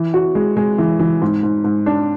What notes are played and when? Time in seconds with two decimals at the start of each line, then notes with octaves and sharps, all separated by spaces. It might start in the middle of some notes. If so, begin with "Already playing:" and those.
Already playing: E3
0.14 F#4
0.35 G#3
0.57 G#3
0.78 E3
0.99 E3
1.22 G#2
1.43 G#2
1.64 G#2
1.86 D4